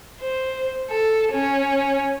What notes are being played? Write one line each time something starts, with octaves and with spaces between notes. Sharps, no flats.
C5
A4
C#4